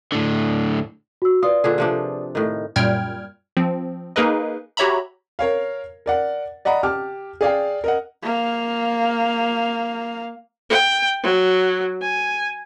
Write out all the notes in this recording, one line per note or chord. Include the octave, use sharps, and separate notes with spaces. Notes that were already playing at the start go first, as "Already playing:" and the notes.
A2 D3
F#4 E6
F4 B4 D5 D#6
A#2 D3 G#4
C3 F3 D4
A2 D#3
F#2 A#2 G3 G5 F6 G#6
F3 C4
A#3 D#4 G#4 A#4 B4 D#5
F#4 G4 C#5 E5 A#5 B5
A#4 C#5 F5
A#4 D5 F#5
D5 D#5 F#5 A#5 B5
G4 A5 D6 F6
G#4 D5 F5 G5
A#4 D#5 F#5
A#3 F5
G5
F#3
G#5